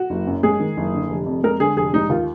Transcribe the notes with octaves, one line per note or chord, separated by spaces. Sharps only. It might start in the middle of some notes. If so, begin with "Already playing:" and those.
Already playing: F#4
F#1
F#2
G#3 G#4
D#3
F#1
D3
F1
F2
G#3 A#4
D3 G#4
F1 G#4
G#3 D#4
D#2 F4